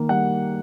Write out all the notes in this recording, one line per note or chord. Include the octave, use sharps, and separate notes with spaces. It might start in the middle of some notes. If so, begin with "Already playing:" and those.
Already playing: D#3 A#3
G3 F#5